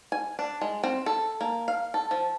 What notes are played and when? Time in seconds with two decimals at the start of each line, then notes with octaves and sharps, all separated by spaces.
0.12 G#5
0.39 D4
0.61 G#3
0.84 C4
1.06 A4
1.41 A#3
1.68 F5
1.94 A4
2.11 F3